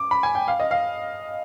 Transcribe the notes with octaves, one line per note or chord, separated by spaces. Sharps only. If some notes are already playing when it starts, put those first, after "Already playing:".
Already playing: D6
B5
G#5
G5
F5
D#5
F5